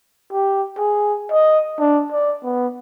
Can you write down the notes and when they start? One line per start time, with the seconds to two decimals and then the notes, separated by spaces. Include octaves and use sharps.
0.33 G4
0.78 G#4
1.31 D#5
1.79 D4
2.12 D5
2.44 B3